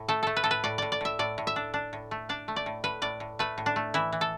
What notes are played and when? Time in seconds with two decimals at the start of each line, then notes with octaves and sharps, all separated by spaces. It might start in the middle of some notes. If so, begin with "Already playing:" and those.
Already playing: A2
0.08 A3 A4
0.23 A3 A4
0.36 B4
0.44 A2 A4
0.51 B4
0.64 A2 D5
0.78 A2 D5
0.92 D5
1.01 A2 E5
1.19 A2 D5
1.38 A2
1.47 E5
1.56 D4
1.74 D4
1.93 A2
2.11 A3
2.29 D4 D5
2.48 A3
2.56 D5
2.66 A2
2.84 A2 B4
3.02 A2 D5
3.20 A2
3.39 A3 B4
3.58 A2
3.66 D4
3.76 A3
3.94 E3 E4
4.12 E3
4.21 A4